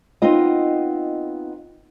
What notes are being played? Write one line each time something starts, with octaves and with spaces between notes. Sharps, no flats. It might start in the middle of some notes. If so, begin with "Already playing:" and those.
B3 C4 D#4 F4 D#5